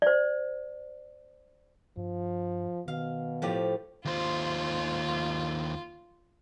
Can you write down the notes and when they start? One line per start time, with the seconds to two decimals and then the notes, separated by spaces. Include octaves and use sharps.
0.02 C5 D5
1.97 G2 F3
2.88 B2 D#3 F5
3.42 A2 F3 G4
4.05 D#2 F4 C5